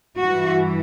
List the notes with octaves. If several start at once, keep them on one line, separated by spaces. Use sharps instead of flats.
G2 E3 F#4